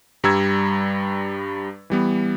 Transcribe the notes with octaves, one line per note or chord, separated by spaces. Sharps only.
G2 G3 A#5 E6 G#6
E3 G3 B3